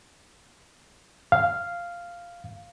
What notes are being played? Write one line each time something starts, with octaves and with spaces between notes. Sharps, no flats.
F5